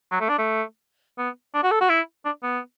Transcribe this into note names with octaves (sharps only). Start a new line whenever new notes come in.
F#3
A3
D4
A3
B3
D4
F#4
A4
F#4
E4
D4
B3